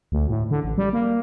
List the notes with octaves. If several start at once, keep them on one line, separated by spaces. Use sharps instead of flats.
D2
A2
D3
A1
G3
A#3